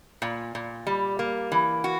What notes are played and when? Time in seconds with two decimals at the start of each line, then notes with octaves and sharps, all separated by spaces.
0.22 A#2
0.55 A#2
0.87 G3
1.19 A#3
1.52 E3
1.84 F#4